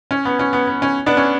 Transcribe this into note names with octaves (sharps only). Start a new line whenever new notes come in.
C#4
B3
C#4
B3
B3
C#4
B3 D4
C#4